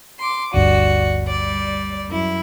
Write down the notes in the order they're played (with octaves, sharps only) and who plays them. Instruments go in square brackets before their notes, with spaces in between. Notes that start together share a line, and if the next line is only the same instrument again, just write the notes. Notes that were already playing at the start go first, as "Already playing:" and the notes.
[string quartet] C6 D6
[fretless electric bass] G1 D2 G2 [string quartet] F#4 D5
[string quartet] G3 D5
F#2 E4